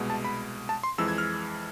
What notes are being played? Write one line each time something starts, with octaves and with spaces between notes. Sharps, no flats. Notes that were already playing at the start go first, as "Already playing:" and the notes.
Already playing: C2 B2 G#3
A5
B5
A5
C6
F2 E3 G#3 E6
G#6
F6